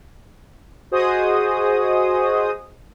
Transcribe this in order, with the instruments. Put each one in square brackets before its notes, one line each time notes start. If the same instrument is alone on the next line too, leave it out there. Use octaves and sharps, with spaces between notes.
[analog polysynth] F#4 G#4 C5 D#5 D#6